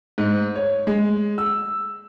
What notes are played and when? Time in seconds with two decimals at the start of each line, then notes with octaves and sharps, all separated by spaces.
0.18 G#2
0.55 C#5
0.87 G#3
1.38 E6